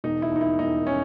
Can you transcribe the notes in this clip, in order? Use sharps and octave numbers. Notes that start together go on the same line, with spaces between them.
E1 D#4
E4
D#2 D#3 D#4
E4
E1 D#4
C#4